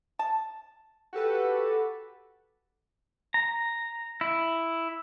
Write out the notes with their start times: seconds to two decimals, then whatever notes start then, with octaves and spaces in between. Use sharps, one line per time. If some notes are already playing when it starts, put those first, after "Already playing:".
0.19 A5
1.13 F#4 G4 A4 B4
3.34 A#5
4.21 E4